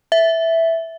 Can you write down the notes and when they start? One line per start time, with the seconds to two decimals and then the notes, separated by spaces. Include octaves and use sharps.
0.12 E5